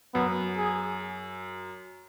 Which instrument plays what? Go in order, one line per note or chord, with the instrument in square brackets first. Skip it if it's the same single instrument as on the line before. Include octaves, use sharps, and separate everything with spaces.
[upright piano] F#2 [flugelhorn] B3
[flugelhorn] G#4